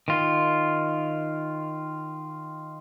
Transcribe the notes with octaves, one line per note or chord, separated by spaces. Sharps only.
D#3 F4